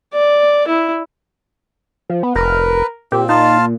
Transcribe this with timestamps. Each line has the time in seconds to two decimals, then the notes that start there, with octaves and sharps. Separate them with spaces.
0.14 D5
0.68 E4
2.10 F3
2.23 B3
2.36 F1 A#4 B4
3.12 A#2 C4 G4
3.29 D#4 F4 F5 A5